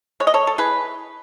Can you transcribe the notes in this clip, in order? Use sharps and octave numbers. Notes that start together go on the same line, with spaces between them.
G#3 C#5
D#5
A4 C#5
A4
E3 G#4 B4